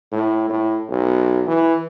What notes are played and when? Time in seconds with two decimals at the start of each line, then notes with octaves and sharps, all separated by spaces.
0.12 A2
0.50 A2
0.90 B1
1.47 E3